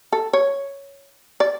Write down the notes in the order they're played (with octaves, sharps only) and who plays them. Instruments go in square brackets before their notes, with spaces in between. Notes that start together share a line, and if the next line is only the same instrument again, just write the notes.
[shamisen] A4
C#5
D5